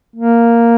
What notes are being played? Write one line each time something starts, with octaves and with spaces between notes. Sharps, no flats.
A#3